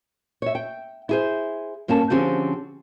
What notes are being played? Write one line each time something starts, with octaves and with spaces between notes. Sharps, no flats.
C#5 E5
G5
E4 G#4 C5
G2 A#3 C#4 A4 A5
D3 F3 C4 C#4 G4 G#4